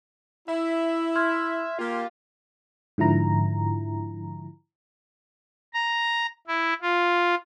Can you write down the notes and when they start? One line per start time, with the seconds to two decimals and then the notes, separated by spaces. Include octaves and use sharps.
0.48 E4 E5
1.15 C6 F6 G#6
1.79 A#3 F4 G4
2.98 G#2 D3 F3 E4 A#5
5.74 A#5
6.47 E4
6.82 F4